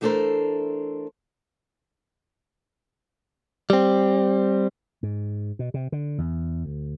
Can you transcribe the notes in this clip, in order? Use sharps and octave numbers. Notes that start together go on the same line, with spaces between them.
E3 A3 D4 A4 A#4 C5
G3 C4
G#2
B2
C3
D3
E2
D2